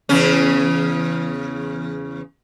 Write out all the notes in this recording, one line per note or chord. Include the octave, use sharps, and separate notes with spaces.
E2 C#3 C#4